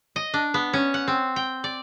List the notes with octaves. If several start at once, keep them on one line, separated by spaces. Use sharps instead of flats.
D#5
D4
B3
C#4
F#5
C4
G5
D5